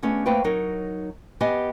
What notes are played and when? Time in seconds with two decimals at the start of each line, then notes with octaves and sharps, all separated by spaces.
0.02 A3 B3 C#4 D4 G#4
0.26 A3 A#3 C4 B4 F5 G5
0.44 F#3 D#4 A#4 C#5
1.41 B3 G4 D#5 G#5